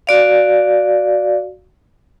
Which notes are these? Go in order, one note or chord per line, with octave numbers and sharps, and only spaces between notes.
F#4 D5 F5